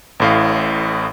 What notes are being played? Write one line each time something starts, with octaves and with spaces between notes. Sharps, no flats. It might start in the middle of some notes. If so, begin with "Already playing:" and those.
A1 A2 F5